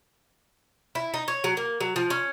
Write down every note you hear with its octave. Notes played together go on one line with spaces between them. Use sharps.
E4
D#4
C#5
F#3
A#3
F#3
F3
C#4